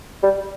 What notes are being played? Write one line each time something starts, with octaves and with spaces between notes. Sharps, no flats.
G3